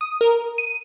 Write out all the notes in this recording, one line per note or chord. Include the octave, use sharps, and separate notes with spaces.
D#6
A#4
D#7